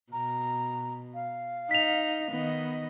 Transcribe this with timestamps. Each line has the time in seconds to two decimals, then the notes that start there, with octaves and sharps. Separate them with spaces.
0.12 B2 A#5
1.14 F5
1.71 D#4 B6 F7
2.31 D#3 B3 D#5